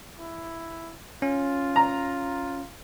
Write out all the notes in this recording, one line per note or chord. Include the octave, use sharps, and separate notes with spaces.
E4
C#4 F4
A#5